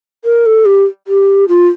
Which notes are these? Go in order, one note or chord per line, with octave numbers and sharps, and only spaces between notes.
A#4
A4
G4
G4
F4